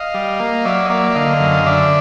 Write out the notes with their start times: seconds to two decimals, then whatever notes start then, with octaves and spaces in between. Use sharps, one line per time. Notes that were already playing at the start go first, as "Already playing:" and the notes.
Already playing: D#5 F5
0.14 G3
0.40 A#3
0.65 F#3 D5 E5
0.85 D#5
0.90 A#3 D5 E5
1.10 E5
1.15 D3 D#5 F5
1.40 F#2
1.66 D3 D5 E5